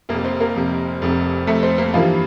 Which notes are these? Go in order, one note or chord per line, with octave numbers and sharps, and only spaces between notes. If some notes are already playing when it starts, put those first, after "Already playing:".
F1 F2 C3 A#3 A#4
C4 C5
A#3 A#4
F1 F2 C3
F1 F2 C3
F1 F2 C3 A3 A4
C4 C5
A#3 A#4
G2 E3 F3 G3 A#3 F4